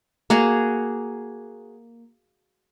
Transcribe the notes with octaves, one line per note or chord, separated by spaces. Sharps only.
A#3 F#4 G#4